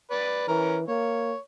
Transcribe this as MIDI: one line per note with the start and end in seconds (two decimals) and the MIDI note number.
0.11 0.44 71
0.11 0.44 74
0.48 0.85 52
0.48 0.76 61
0.48 0.76 70
0.88 1.34 58
0.88 1.39 73